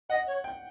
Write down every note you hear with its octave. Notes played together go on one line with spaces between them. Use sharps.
D#5 F#5
C#5
G5